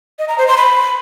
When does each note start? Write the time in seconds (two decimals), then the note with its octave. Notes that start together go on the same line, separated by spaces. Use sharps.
0.19 D#5
0.28 A#5
0.38 C5
0.48 C6
0.57 B5